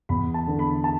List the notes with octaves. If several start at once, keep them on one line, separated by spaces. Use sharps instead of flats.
E2 B5
A5
D3 B3
B5
A5